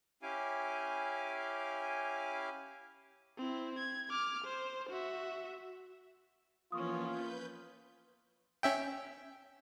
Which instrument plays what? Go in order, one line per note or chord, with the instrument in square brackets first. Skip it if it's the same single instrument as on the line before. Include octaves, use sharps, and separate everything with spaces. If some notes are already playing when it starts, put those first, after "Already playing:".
[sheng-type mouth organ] C#4 E4 G4 F5 G#5 D6
[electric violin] C4 E4
G#6
D6 F6
C5
F#4 E5
[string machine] E3 F3 B3 [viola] A#3 C#4 [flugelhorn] F4 [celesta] C#6 D#6
[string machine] B4 G6
[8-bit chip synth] C#4 E5 G5